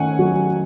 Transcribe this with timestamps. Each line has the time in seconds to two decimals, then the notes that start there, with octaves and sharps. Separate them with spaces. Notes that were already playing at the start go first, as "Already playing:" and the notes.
Already playing: D#3 A3 C#4 F#5 G#5
0.19 F#3